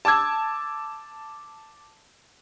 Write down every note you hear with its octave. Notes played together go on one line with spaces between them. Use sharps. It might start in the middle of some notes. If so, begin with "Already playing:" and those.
A5 D6 E6 G#6